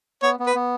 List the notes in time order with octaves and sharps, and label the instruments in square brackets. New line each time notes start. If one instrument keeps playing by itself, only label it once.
[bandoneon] B3 [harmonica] C#5
[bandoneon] B3
[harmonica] B4
[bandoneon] B3